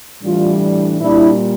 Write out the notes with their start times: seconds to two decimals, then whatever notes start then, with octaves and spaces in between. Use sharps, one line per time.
0.23 A2 E3 G3 D4 F4
1.01 A#2 G3 D4 E4